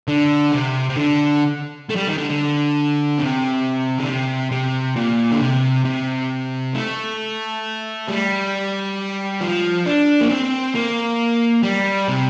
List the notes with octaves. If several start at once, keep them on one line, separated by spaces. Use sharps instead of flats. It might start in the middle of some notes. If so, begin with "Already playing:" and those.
D3
C3
C3
D3
A3
G3
D#3
D3
D3
C3
D3
C3
C3
A#2
D3
C3
C3
A3
G3
F3
D4
A#3
C4
A#3
G3
C3